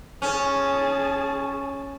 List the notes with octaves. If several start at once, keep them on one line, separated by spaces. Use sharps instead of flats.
C#4 G#4 A5